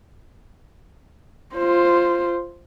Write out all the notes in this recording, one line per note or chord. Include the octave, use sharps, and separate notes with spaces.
F4 C5